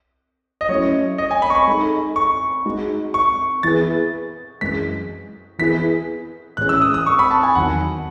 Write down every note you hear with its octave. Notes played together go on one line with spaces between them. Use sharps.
D#5
F#3 A3 C#4 E4 C#5
D#5
G#5
B5
C#6
B5
G#3 D#4 A4
C#6
G#3 D#4 F#4
C#6
E3 B3 E4 G#4 B4 A6
F#2 E3 G#3 B6
E3 B3 E4 G#4 B4 B6
A2 E3 G#3 C#4 F#6
E6
D#6
D#6
C#6
B5
A5
G#5
E2 D#3 F#3 F#5